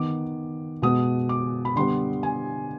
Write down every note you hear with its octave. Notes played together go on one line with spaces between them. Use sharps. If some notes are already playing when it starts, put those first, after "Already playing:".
Already playing: D#3 B3 D6
B2 G#3 B3 D#6
D6
B5
D3 G3 B3 C6
G#5